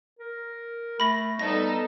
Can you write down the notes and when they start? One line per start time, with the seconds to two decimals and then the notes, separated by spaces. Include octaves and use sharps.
0.19 A#4
1.00 A3 B5 A#6
1.39 G3 B3 D#4 A4 A#6